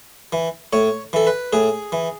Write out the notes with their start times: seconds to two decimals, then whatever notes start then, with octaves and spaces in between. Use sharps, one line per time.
0.33 E3
0.73 A2 C#5
1.13 E3 A4
1.27 B4
1.53 A2 G#4
1.92 E3